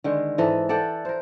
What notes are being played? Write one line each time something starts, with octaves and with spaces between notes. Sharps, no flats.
D3 D#3 G#3
G#2 E3 A4 D#5
A4 D5 F#5 G5
A#4 C5